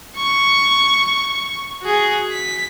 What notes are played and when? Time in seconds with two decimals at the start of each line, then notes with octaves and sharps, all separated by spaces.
0.17 C#6
1.82 F#4 G#4
2.32 B6